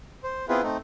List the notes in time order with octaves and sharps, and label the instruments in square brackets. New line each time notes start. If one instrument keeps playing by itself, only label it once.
[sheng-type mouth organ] C5
B3 C4 E4 F4 G#4 B4
A3 C4 D#4